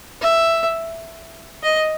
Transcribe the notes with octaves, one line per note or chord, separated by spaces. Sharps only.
E5
D#5